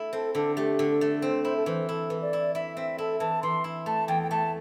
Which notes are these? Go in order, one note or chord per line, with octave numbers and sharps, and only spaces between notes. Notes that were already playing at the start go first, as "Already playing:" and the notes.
Already playing: A3 E4
C4 A4
D3 A4
A3 G4
D3
A4
A3
C4 C5
E4 C5
A4
E3 C5
E4 A4
E3
D5
E4
E4 E5
C4 E5
E4 A4
E3 A5
E3 C6
E4
A3 A5
E2 G5
G5
A3 A5